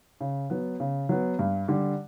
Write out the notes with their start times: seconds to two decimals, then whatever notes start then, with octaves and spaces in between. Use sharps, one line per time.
0.21 C#3
0.50 F#3 B3
0.80 C#3
1.09 F#3 B3
1.39 G2
1.68 D3 G3